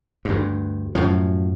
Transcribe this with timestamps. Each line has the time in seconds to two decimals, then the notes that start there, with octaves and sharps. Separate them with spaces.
0.25 D2 G2
0.95 F#2 A2 F3